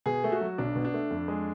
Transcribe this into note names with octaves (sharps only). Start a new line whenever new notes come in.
B2 G#4
A3
F#4
F#3
B1 D4
B2
D4
A3
F2
G#3